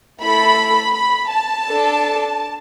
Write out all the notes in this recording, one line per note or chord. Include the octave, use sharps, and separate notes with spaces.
A3 E4 A4 B5
B5
A5
D4 A4